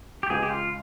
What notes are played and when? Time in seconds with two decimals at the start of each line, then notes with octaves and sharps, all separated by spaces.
0.23 G4
0.30 C#2 G#4
0.43 G4
0.50 F4